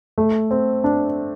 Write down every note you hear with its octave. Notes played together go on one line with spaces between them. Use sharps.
A3
C4
D4